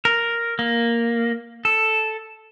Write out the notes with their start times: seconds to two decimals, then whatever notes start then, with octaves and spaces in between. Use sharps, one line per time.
0.05 A#4
0.59 A#3
1.65 A4